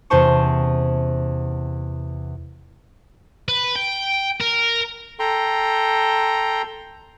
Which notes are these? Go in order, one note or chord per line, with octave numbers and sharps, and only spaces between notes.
E2 C3 C#4 C5 A5 C#6
B4
G5
A#4
A4 G5 A#5 C6